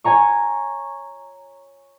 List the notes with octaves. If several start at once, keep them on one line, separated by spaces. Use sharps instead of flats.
C#5 G#5 A#5 C#6